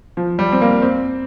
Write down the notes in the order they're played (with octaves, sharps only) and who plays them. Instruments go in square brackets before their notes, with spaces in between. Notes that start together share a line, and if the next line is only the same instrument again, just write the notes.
[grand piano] F3
G3
C4
A#3
C4